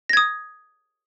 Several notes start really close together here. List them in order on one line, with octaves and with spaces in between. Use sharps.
A#6 G#6 D#6